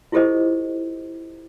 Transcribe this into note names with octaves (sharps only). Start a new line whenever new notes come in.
E4 F4 G4 A4 C5 D#5